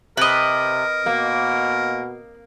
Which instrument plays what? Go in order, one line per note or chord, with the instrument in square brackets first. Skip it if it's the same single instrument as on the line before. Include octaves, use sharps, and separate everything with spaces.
[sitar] C3 [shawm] A#4 [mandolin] B4 D#5
[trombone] B2 [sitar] A#3